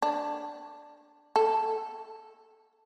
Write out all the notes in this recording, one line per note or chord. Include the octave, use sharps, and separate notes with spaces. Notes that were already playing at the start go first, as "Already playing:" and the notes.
D4
A4